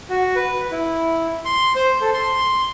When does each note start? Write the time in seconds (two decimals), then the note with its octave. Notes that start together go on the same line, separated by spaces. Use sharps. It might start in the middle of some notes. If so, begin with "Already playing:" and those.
0.09 F#4
0.36 B4
0.72 E4
1.45 C6
1.76 C5
2.01 A4
2.14 C6